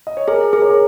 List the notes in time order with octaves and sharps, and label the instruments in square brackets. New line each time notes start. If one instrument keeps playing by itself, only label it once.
[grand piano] D#5
C#5
[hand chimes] G#4 [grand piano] A#4
[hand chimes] G#4 [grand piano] A#4
[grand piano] C#5
A#4